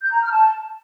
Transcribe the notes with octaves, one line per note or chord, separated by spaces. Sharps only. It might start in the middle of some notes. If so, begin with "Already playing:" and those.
G6
A#5
F6
A5